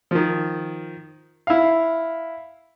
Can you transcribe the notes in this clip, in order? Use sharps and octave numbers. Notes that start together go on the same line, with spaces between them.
D#3 F3
E4 F5